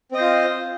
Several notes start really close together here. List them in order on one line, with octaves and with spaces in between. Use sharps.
C4 D#5 C5 F4